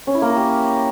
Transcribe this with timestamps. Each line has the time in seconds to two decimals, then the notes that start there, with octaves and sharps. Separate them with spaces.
0.07 C#4
0.15 E4
0.22 A#3
0.29 A#4
0.36 G4